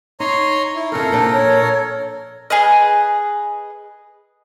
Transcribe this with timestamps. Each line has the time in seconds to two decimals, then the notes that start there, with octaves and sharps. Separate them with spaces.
0.20 D#4 C#5 A#5 C6
0.75 E4
0.92 F2 C#3 A4 A#4
1.12 A#2 F3 D4
1.33 C#5
2.50 G#4 B4 D#5